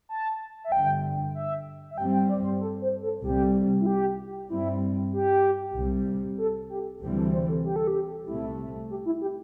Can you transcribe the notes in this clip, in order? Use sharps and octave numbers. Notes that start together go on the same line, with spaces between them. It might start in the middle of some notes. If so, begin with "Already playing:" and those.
A5
E5
G1 G2 D3 G5
E5
E5
G2 G3 C4 G5
G5
D5
C5
A4
C5
A4
C2 C3 G3 G4
E4
G4
G2 G3 C4 E4
G4
C2 C3 G3
A4
G4
D2 C3 E3 G3 C4 G4
A4
C5
A4
G4
A4
G4
C2 C3 A3 E4
G4
E4
G4